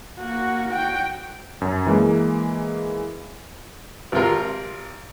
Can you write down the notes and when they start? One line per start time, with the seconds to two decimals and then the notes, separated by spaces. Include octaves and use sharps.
0.19 A#3 F#4
0.69 F#4 G5
1.61 F#2
1.87 E3 G#3 A#3
4.12 G#1 C3 F4 A#4